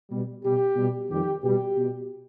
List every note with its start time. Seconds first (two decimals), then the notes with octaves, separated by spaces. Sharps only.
0.10 B2 G3
0.44 B2 G3 G4
0.77 B2 G3
1.10 F2 D#3 G3 G4
1.44 B2 G3 G4
1.78 B2 G3